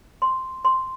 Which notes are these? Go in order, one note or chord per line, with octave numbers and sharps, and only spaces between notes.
C6
C6